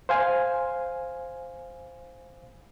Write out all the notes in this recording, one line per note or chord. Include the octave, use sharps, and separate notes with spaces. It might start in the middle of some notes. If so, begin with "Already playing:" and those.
C5 F5 G#5